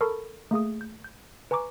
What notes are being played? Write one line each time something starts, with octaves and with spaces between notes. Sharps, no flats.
A4 A#4 A5 B5 C#6
A3 A#3 G#4 D#6
G6
G6
B4 G#5 A#5 C#6 D6